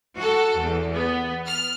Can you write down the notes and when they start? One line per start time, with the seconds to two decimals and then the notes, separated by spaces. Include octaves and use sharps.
0.16 F#4 A4
0.58 E2
0.93 B3
1.45 F6